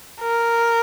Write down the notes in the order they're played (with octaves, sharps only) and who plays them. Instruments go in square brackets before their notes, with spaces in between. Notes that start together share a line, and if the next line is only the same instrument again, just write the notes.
[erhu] A#4